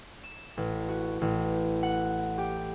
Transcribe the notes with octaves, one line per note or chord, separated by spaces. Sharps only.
E7
A1
F#4
A1
F#5
G4